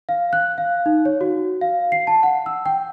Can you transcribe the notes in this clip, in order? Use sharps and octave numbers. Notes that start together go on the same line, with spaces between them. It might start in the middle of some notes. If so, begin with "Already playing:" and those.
F5
F#6
F5
D#4
C#5
F#4
F5
C7
A5
F#5
E6
G5